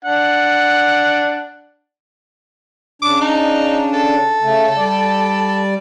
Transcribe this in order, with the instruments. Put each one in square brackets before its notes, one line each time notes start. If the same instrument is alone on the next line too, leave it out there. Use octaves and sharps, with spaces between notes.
[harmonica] D4 F#5
[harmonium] C#3 D4 [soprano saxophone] D6
[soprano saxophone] D#4
A4
[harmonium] C#3 A3
G3 D5